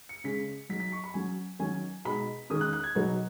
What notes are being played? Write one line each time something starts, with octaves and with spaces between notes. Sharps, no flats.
C#7
C#3 G#3 C#4 B6
F#3 D#4 B6
B6
C#6
B5
F#3 C#4 G#5
D#3 F#3 C#4 G#5
B2 G#3 D#4 B5
D#3 G#3 C#4 D#6
F#6
F#6
G#6
B2 F#3 B3 D#4